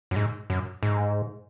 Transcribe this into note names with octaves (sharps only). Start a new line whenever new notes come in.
F#2
G#2
F#2
G#2